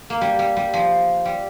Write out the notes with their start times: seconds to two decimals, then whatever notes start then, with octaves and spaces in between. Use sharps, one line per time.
0.10 A#3
0.21 G3
0.39 G3
0.57 G3
0.74 F3
1.25 G3